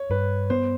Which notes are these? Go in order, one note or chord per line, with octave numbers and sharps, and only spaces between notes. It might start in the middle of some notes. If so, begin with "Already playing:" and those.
Already playing: C#5
G2 B4
B3 C5